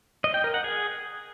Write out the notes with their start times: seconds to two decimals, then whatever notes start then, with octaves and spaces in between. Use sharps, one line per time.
0.24 D#5
0.34 G5
0.44 A#4
0.54 F#5
0.64 G#4